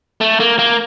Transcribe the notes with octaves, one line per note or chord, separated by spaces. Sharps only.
A3
A#3
A#3